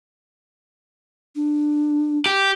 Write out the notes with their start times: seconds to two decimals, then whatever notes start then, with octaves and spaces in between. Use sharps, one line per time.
1.36 D4
2.26 G4